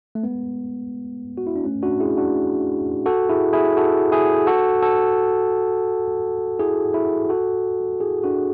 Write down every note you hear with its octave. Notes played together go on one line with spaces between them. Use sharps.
A3
G#3 B3
F#4
E4
D4
A3 C#4
D4 F#4
E4 G#4
D4 F#4
F#4 A4
E4 G#4
E4 G#4
F#4 A4
E4 G#4
F#4 A4
F#4 A4
E4 G#4
E4 G#4
F#4 A4
E4 G#4
D4 F#4